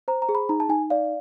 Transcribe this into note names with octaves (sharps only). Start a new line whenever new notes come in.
C5 A#5
A#5
G#4
B5
D#4 A#5
A5
D#4 G#5
D5 F5